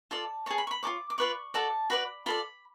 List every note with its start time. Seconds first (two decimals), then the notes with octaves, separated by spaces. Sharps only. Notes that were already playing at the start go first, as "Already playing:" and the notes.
0.11 F4 A4 D5 A5
0.46 G#4 C#5 A5
0.58 B5
0.67 C#6
0.71 B5
0.83 F4 A4 C#5 D6
1.10 D6
1.18 F4 B4 D5 C#6
1.54 F#4 A4 D5 A5
1.90 F#4 B4 D5 B5
2.26 F4 A4 D5 B5